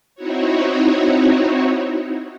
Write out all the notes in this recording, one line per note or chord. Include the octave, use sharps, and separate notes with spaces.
C4 D#4 E4 F#4 C#5